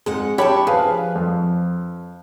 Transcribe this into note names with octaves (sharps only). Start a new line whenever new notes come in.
F2 G#3 D#4 F#5
D4 G4 C#5 E5 A5 B5
F3 G#4 B4 F5
F2